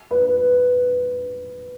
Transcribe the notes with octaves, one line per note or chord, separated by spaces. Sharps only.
B4